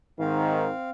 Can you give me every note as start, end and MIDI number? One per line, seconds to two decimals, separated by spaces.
0.20 0.71 44
0.20 0.71 51
0.20 0.91 60
0.20 0.91 77